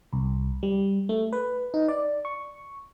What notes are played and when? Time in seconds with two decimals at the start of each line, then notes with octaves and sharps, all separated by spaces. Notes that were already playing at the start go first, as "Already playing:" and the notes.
0.13 C2
0.63 G3
1.09 A3
1.33 B4
1.74 D#4
1.88 D5
2.25 C#6